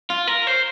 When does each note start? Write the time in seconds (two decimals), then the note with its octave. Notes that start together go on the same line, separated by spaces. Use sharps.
0.10 F4
0.28 A#4
0.47 C5